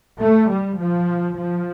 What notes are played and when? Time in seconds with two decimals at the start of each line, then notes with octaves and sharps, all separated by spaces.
0.20 A3
0.49 G3
0.79 F3
1.39 F3